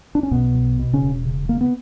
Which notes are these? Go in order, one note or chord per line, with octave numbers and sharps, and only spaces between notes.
D4
C#4
B1 B2 B3
B1
B2
C#3 C#4
E1
C#3
C#3 A#3
B3